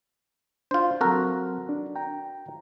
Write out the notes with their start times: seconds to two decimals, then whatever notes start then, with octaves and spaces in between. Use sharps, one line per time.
0.71 D4 F4 C5
1.01 F#3 C4 F#4 A4 A#4
1.69 D4
1.96 G5 A#5